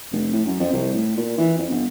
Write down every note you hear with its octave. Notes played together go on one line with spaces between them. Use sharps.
F1
A2
F#2
F2
C2
A2
A#2
E3
F2
G1